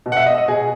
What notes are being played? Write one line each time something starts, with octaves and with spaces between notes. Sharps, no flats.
B2
F#5
E5
D#5
D#5
B2 G#4